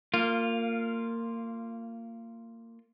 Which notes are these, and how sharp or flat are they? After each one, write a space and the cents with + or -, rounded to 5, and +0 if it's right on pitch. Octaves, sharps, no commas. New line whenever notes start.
A#3 -25 F4 +0